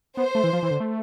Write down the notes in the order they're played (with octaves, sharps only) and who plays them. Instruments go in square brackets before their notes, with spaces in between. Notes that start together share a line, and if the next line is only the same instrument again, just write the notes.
[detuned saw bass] B3 [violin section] C5
[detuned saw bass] A3
E3
F3
E3
D3
A3